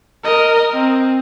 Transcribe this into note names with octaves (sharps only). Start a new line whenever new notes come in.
A#4 D#5
C4